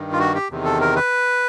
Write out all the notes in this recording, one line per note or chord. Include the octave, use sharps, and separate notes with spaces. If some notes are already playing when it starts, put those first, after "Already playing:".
Already playing: G2 D#3
F4
F#4
G4
E2 C3 D#3
A4
A#4
B4